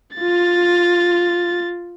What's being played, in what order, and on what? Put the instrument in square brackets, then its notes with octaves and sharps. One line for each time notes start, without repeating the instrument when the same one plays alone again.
[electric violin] F4 A6